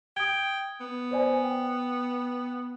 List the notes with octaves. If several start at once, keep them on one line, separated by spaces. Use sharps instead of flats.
G5 D#6 G#6
B3
C5 D5 G#5
G5